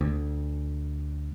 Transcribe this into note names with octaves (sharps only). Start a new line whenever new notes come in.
D2